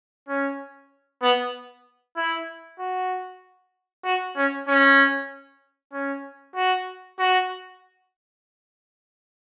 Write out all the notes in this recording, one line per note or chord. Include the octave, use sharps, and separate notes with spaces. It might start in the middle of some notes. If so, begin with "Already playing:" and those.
C#4
B3
E4
F#4
F#4
C#4
C#4
C#4
F#4
F#4